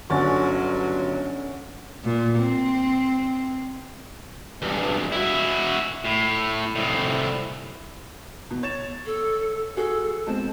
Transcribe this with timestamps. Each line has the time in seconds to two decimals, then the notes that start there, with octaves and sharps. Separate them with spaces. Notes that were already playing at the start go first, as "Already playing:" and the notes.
0.10 G1 D3 F#3 C#4 A6
2.04 A#2
2.39 C4
4.62 E2 G2
5.12 E4 F#4
6.05 A2
6.76 C2 A2
8.51 B2
8.63 C#5 A6 E7
9.06 A4
9.77 F#4 G#4 A4
10.27 B2 G#3 C4 A5